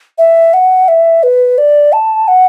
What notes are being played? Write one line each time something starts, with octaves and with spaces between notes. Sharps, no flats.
E5
F#5
E5
B4
D5
A5
F#5